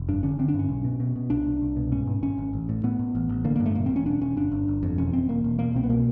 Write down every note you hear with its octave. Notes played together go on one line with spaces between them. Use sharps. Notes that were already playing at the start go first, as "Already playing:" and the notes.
Already playing: F1
G2 D4
D3 C#4
D3 C4
D4
G2
C#4
B1
B2
B2
B2
C2 D4
C2
C2
B2
G#2 C#4
G#2
G#1 C#4
G#1
A1
A2
A2 B3
A2
A1
A1
D3 A#3
G2 A#3
A3
E1 A#3
C4
E2
C#4
E1 D4
E1 C#4
G1 D4
G1
G1
F2
E1 C#4
E1 C4
E1 A#3
E1
B2 A#3
C2 C4
B3
B2 A#3